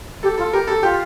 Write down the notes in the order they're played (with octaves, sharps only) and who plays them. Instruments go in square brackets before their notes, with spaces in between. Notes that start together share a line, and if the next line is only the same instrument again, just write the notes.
[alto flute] G4 [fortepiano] A4
[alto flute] F4 [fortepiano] A4
[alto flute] G4 [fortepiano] A#4
[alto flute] G4 [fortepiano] A4
[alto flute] F4 [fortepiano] G4